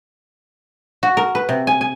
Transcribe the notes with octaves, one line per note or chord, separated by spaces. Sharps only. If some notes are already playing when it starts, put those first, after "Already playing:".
F#4
A#4
B4
C3
G#5
G#5